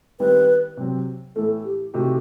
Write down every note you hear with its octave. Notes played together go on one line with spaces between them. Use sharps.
D#3 G3 C4 E4 G4 B4
C3 F#3 C4
A2 E3 A3 A4
G4
C3 E3 A3 D#4 F#4 G4